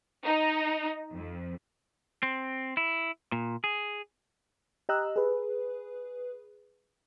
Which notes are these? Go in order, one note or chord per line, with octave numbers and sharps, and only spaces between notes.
D#4
F2
C4
E4
A#2
G#4
G4 D#5 A#5 E6 F#6
G#4 B4